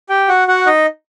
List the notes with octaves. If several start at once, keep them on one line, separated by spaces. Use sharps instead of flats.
G4 G5
F#4 F#5
F#4 F#5
D#4 D#5